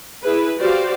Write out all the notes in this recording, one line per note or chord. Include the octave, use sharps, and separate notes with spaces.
E4 G#4 B4
F#4 G4 C5 D5 F5